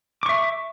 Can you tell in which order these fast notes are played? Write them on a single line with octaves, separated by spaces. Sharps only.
D6 C#6 E5